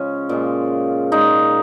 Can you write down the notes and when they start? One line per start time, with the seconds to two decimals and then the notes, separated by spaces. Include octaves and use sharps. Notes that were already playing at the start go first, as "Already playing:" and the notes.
Already playing: C#3 F3 G#3 C#4
0.29 A#2 F3 G#3
1.12 A#2 G#3 D#4